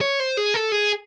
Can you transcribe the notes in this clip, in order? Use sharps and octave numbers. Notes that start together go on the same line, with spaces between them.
C#5
C5
G#4
A4
G#4